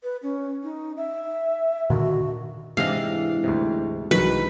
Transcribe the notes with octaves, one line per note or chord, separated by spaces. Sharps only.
B4
C#4
D#4
E5
A#2 D3 D#3 F#4
G#2 C3 E3 D4 D#5 F5
D2 G#2 C3
C2 G#2 D#3 E3 F#3 B4